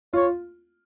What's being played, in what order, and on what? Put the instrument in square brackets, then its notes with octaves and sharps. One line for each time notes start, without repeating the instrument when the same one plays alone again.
[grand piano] F4 [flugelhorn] C#5